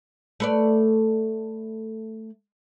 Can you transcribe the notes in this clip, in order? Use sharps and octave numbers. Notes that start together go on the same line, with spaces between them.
A3 B4 D5